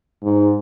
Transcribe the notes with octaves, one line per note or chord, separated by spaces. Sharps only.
G#2